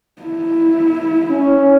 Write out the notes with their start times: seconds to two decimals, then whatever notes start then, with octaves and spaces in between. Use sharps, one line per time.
0.22 E4
1.29 C#4